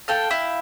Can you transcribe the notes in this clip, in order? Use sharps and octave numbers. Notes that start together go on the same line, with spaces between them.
A4 F5 G5
E4